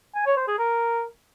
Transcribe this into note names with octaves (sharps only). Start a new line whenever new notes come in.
G#5
C#5
C5
G#4
A#4